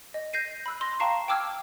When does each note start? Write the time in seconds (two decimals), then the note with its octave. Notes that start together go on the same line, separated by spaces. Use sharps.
0.14 D#5
0.33 G6 A#6 C7 D#7
0.66 B5 E6 F#6
0.81 C6 A#6
1.00 F5 G5 A5 A#5 C#6 C7
1.28 G5 A5 D6 E6 F6 G#6